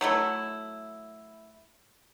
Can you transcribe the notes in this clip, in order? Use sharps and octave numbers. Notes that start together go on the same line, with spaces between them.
F#3 A3 E4